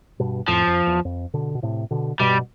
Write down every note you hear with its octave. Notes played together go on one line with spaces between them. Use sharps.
G2 B2
F2 A2 F3
F2
E2
F2
B2 D3
B2
A2 C3
B2 D3
G2 B2 G3